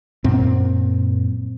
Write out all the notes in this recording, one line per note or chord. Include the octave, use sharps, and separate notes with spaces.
F#2 A#2 C4